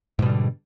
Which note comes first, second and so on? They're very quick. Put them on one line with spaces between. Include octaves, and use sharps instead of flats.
G#2 B2 G3 D3